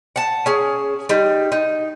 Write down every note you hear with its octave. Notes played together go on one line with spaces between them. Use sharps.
F#5 A5
C#4 G#4
G3 D#4
D#4